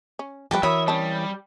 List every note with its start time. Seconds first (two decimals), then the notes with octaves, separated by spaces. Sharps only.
0.19 C#4
0.51 F3 G3 F#4 G4 B4 G5 A5
0.63 E3 F#3 A#4 C#5 E5 B5 D#6
0.88 G3 C4 C#4 A5